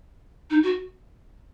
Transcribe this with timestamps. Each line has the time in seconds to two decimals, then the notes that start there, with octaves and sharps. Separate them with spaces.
0.50 D#4
0.63 F#4